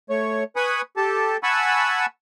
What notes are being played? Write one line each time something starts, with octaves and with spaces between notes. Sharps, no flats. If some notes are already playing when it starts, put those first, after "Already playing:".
A3 C#5
B4 G#5 B5 C#6 D#6
G4 A4 A5
F#5 G#5 A5 B5 C#6 E6